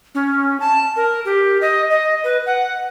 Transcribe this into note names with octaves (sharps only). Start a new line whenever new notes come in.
C#4
A5
A#4
G4
D#5
D#5
B4
F#5